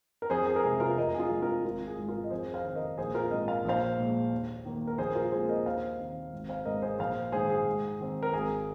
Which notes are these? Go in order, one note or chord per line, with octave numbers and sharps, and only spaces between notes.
A#4
F2 G#4 C5
G#4
A#4
C3 G#3 C4 G#4
F4 A#4
F1 A#4 D#5
G#4
F4 A#4
F2 F3 G#3
F4 A#4
G#1 F4
G#4
G#2 G#3
F4 A#4
D#5
F2 G#4 C5
C5 F5
D#3 C4
A#4 D#5
A#1 G#4 C5
F4 A#4
G#2 F3 C4 A#4 D#5
F5
A#1 C5 F5
A#2 G#3
D#2
D#3 A#3
A#4
A#1 G#4 C5
F4 A#4
A#2 G#3 C4 G#4 C5
A#4 D#5
D#2 C5 F5
D#3 C4
G#1
C5 F5
G#2 G#3 C4 A#4 D#5
G#4 C5
A#1 C5 F5
G#2 D#3 G#4 C5
G#4
G#2
D#3 C4
A#4
G#1 G#4